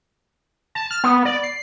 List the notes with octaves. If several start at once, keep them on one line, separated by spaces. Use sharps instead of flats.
A5
F6
B3
D5
C7